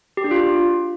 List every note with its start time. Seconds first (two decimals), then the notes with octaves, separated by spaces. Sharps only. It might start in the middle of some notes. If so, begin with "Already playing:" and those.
0.17 G4
0.24 D4
0.31 F4